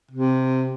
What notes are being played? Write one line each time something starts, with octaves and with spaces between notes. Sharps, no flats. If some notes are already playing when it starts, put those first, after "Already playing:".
C3